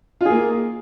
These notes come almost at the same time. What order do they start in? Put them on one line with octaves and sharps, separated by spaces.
F4 G#4 A#3